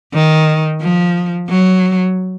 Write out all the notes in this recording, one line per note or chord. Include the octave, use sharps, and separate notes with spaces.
D#3
F3
F#3